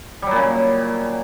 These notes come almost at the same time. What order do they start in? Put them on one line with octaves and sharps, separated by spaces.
G3 F#3 A#2 C#3